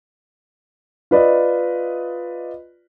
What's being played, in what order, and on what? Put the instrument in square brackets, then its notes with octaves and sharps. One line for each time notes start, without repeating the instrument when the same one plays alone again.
[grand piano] F4 B4 D5 D#5